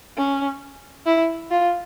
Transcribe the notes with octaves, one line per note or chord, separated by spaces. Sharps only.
C#4
E4
F4